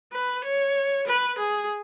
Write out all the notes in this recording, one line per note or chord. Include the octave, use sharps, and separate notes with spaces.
B4
C#5
B4
G#4